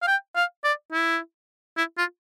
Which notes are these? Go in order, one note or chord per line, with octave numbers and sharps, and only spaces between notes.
F5
G5
F5
D5
E4
E4
F4